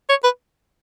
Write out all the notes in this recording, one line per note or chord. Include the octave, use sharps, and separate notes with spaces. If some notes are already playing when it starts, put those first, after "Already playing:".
C#5
B4